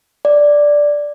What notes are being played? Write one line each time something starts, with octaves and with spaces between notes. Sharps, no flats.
D5